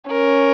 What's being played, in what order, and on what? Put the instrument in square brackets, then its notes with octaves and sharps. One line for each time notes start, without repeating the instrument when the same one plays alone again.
[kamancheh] C#4 [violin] A#4